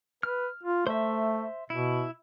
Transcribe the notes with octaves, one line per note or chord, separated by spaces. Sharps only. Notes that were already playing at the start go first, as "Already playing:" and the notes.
B4 F6
F4
A3 C5 E5
B2 E4